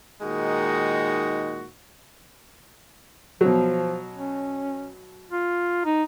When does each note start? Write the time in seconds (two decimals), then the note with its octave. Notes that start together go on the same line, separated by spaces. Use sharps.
0.21 A#2 D#3 G#3 D#4 F#4
3.41 B2 F3 F#3
4.13 C#4
5.31 F4
5.85 D#4